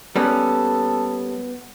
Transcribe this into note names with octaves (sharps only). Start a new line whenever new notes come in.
G3 A#3 B3 C#4 A4